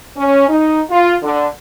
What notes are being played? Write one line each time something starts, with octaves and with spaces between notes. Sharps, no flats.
C#4
D#4
F4
D3